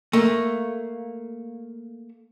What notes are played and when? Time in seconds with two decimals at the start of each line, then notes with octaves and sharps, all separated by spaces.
0.13 A3 A#3